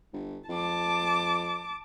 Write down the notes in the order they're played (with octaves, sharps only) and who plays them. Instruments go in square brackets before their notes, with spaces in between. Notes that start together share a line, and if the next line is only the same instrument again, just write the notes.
[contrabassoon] G1
[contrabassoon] F2 [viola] A5 D6